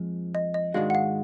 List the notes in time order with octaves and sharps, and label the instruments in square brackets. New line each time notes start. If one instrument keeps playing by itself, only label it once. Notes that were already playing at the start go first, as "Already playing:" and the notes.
Already playing: [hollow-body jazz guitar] F2 F3 G#3
[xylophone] D#5
D#5
[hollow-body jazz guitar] G#2 D#3 G#3 D4 F#4 [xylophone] F5
[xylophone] F#5
F5